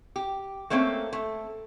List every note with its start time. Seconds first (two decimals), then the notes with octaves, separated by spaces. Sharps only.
0.16 G4
0.70 A3 A#3 C4 C#4 A4
1.13 A3